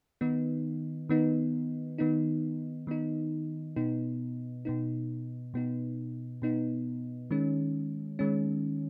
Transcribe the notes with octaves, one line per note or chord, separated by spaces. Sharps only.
D#3 B3 D#4
D#3 B3 D#4
D#3 B3 D#4
D#3 B3 D#4
B2 B3 D#4
B2 B3 D#4
B2 B3 D#4
B2 B3 D#4
D#3 G#3 C#4
D#3 G#3 C#4